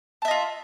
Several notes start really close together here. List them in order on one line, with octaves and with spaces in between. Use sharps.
A5 E5 D#5 F4